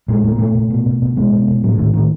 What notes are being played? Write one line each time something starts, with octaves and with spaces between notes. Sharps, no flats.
A#2 G#3
A#2 A3
A#3
A#2 A3
A#2
B2
B2
B2
B2 G#3
B2
B2
A2 F#3
D3
A2 D#3
A2 D#3